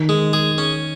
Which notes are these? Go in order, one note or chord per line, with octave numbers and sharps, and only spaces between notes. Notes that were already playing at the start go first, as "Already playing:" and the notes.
Already playing: D#3
G#3
G#4
C#4